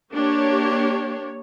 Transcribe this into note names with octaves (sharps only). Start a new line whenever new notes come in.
A#3 D4 G4 C#5